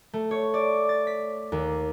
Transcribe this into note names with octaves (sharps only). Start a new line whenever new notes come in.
A3
C#5
D5
A6
B6
D#2